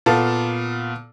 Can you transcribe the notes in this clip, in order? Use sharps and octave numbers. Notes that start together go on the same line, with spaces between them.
A#2 B3 A4 F5 A5